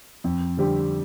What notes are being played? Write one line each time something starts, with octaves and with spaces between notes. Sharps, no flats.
F2
D3 G3 C4 G4